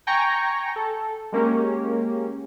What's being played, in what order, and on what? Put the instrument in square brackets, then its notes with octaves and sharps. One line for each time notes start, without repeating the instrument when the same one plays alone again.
[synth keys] G5 G#5 A#5 C#6
A4
G#3 A#3 C#4 G4